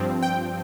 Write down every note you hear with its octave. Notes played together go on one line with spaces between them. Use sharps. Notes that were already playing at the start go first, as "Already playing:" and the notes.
Already playing: G2 F3 C4
G5